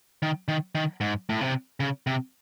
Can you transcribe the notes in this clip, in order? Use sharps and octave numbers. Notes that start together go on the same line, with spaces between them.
D#3
D#3
D#3
G#2
A2
C3
C#3
C3